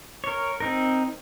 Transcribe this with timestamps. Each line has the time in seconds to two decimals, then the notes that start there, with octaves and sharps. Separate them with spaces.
0.24 A#4 C#5
0.60 C4 D#4 A#4